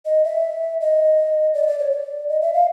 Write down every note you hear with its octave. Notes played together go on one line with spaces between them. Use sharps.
D#5
E5
D#5
D5
D#5
D5
C#5
D5
D#5
E5
F5